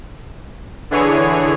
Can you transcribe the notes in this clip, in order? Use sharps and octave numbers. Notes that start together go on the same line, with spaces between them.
D3 E3 G#4 C#5